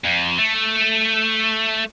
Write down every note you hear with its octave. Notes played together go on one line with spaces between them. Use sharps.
F2
A3